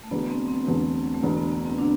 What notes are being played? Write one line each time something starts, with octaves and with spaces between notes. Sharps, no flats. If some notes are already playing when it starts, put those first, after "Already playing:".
A3
E1 E2 D3 B3
C4
C4
E1 E2 D3 A3
A3
E1 E2 D3 B3
B3
B3
C4
D3 D4